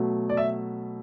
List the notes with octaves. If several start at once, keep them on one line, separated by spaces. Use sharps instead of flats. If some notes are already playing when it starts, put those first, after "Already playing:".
Already playing: B2 F#3 A3
D5
E5